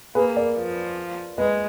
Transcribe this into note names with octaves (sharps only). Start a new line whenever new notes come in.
A#3 G#4 B4
A#4 D5
F3
G#3 B4 D#5